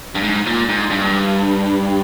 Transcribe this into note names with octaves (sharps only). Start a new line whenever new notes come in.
G2
G#2
A#2
G#2
G2